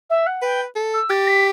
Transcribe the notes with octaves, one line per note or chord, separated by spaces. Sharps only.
E5
F#5
B4 G5
A4
E6
G4 A6
B6